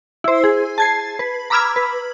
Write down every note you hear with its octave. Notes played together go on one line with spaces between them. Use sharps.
E4 C5
G#4
A5 G#6 C7
B4
A#5 B5 D6 E6 F6 G#6
B4